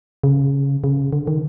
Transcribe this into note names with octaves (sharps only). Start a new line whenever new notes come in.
C#3
C#3
D3
D#3